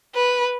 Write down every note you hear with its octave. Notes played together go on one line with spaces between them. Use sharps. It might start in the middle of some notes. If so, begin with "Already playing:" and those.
B4